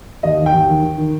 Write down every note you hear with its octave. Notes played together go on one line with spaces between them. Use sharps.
D#2 D#5
D#3
G5
D#2
D#3
D#3
D#3